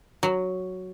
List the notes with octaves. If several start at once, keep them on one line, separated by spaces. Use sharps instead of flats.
F#3